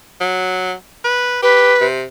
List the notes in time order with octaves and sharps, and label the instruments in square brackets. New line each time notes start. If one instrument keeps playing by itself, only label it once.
[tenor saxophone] F#3
B4
[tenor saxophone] G4 [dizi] B4
[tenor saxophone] C3